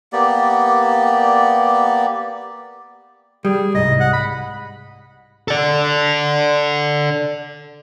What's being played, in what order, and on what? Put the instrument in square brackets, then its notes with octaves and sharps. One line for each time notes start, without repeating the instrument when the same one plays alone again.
[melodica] A#3 B3 G4 D5
[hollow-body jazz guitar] G3 [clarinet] G#4
[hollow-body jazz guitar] C2 G#2 [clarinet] D#5
[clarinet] F#5
B5
[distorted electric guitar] A4 D5